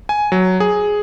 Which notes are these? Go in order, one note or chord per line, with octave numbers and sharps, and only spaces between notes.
G#5
F#3
G#4